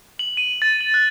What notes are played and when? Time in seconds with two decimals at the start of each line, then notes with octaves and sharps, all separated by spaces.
0.19 F#7
0.37 D#7
0.62 A6
0.81 F#7
0.94 F#6